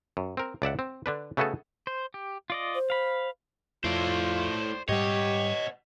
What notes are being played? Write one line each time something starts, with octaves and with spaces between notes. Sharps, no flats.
F#2
C4 A#4
C#2 D5 E5 F#5
C4
D3 D4 B4
C#3 A3 B3 F#4 G#4 A4
C5
G4
F4 D5 D#5
C5
F5 B5
F2 A3 E4 F4 C5 D5
G#2 G3 G4 C#5 D#5 F#5